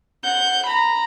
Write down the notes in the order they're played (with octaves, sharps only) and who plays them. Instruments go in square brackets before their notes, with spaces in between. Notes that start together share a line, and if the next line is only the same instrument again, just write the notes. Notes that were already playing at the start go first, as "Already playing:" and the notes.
[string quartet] F#5 G6
A#5 B5